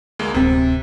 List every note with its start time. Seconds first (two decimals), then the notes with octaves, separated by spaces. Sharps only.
0.19 D2 G#3 A#3
0.34 D1 C3 C4